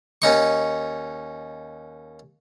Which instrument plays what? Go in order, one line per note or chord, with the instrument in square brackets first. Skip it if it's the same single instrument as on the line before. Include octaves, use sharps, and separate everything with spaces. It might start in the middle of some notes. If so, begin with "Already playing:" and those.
[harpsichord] D#2 C#4 D#4 C#6